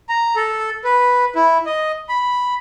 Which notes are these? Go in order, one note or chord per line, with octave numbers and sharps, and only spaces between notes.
A#5
A4
B4
E4
D#5
B5